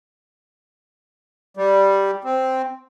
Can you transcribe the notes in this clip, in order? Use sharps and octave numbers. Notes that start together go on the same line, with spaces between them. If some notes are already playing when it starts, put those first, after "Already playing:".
G3
C4